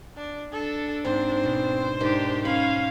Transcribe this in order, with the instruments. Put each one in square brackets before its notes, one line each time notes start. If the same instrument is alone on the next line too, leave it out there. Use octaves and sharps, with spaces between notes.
[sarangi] D4
[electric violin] D4 [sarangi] A4
[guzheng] G#2 [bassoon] C4 [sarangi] C5
[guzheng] B2
[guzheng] G#2 [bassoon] D#3 [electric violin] D4 G4
[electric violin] C#4 F5 [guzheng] B5